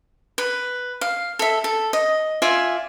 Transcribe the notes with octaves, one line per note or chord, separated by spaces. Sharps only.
B4
F5
A4 E5
A4
D#5
F4 D5 E5 G#5